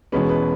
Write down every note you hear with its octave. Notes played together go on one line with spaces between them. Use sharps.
E1 E2 B2 G#3 C#4 B4
B4